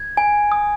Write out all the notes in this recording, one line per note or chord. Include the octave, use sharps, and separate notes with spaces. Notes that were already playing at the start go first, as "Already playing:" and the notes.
Already playing: G#6
G#5
D#6